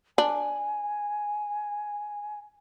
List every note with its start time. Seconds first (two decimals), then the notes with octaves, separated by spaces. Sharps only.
0.18 D4 G#5